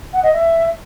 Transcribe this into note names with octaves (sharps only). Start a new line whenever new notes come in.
F#5
D#5
E5